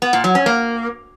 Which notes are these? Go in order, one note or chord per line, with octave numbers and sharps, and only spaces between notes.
B3
A#2
F#3
C#4
A#3